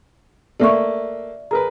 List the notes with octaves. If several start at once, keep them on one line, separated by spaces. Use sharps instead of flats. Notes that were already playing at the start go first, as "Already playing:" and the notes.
A3 A#3 D5 E5 C#6
G#4 A#4 B4 A#5